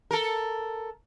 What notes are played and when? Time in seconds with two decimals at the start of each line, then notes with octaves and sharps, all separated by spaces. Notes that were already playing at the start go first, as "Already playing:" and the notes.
0.11 A4 A#4